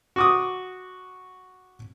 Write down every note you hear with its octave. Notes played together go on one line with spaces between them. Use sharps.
F#4 D6 D#6